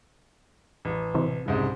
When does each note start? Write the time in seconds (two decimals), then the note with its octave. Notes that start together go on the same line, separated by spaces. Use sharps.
0.85 A1
1.15 C3 E3
1.46 C2 G#2 C#3